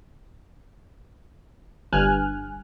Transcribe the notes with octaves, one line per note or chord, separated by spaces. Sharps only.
G1 G2 G#5 F6 F#6